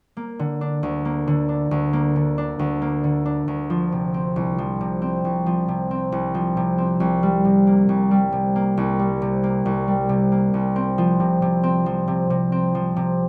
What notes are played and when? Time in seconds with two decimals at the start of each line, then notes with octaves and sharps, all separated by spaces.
0.17 A#3
0.39 D3
0.61 D4
0.83 D2
1.05 A#3
1.27 D3
1.49 D4
1.71 D2
1.93 A#3
2.16 D3
2.38 D4
2.59 D2
2.82 A#3
3.04 D3
3.26 D4
3.48 D2
3.70 F3
3.92 C3
4.14 C4
4.36 C2
4.58 F3
4.81 C3
5.02 C4
5.25 C2
5.46 F3
5.68 C3
5.91 C4
6.12 C2
6.34 F3
6.57 C3
6.78 C4
7.00 C2
7.23 G3
7.45 C3
7.67 A#3
7.89 C2
8.11 G3
8.33 C3
8.56 A#3
8.77 C2
8.99 G3
9.22 C3
9.44 A#3
9.66 C2
9.88 G3
10.09 C3
10.32 A#3
10.54 C2
10.76 C4
10.98 F3
11.20 C3
11.42 C3
11.63 C4
11.86 F3
12.08 C3
12.30 C3
12.52 C4
12.75 F3
12.96 C3